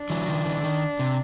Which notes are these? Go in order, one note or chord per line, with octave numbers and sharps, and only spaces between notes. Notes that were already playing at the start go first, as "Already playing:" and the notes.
Already playing: D4
E3 F#3
D#3 F3
D3 E3
D#3
C3